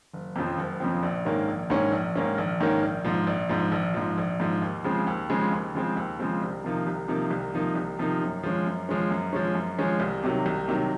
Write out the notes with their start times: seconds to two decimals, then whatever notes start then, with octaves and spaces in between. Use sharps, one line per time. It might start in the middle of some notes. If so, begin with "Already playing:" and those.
0.13 F#1
0.36 F2 C#3 F3 C4
0.58 F#1
0.80 F2 C#3 F3 C4
1.03 A#1
1.25 G#2 D#3 A#3 C#4
1.48 A#1
1.70 G#2 D#3 A#3 C#4
1.92 A#1
2.15 G#2 D#3 A#3 C#4
2.38 A#1
2.60 G#2 D#3 A#3 C#4
2.82 A#1
3.05 G#2 F3
3.27 A#1
3.49 G#2 F3
3.72 A#1
3.94 G#2 F3
4.18 A#1
4.40 G#2 F3
4.62 D#2
4.84 C#3 F3 G#3 C4
5.07 D#2
5.30 C#3 F3 G#3 C4
5.52 D#2
5.74 C#3 F3 G#3 C4
5.96 D#2
6.19 C#3 F3 G#3 C4
6.42 C2
6.64 C3 F3 A#3 D#4
6.87 C2
7.08 C3 F3 A#3 D#4
7.31 C2
7.54 C3 F3 A#3 D#4
7.75 C2
7.99 C3 F3 A#3 D#4
8.21 F#2
8.43 F3 G#3 C#4
8.66 F#2
8.89 F3 G#3 C#4
9.11 F#2
9.33 F3 G#3 C#4
9.55 F#2
9.79 F3 G#3 C#4
10.00 C2
10.23 C3 D#3 F#3
10.46 C2
10.68 C3 D#3 F#3